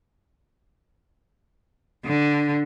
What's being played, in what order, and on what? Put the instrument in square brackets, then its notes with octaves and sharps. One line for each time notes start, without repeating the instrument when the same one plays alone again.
[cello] D3